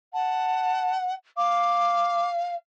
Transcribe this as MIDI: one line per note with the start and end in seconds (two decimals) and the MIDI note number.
0.14 1.15 78
0.14 0.95 81
1.37 2.55 77
1.37 2.29 86